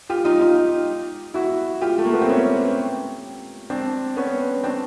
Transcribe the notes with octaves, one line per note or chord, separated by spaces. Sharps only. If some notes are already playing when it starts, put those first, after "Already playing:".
F4 G4
D#4 F4
D#4 F4
E4 F#4
F4 G4
A3
A#3
B3
C4
B3 C#4
C4 D4
B3 C#4
C4 D4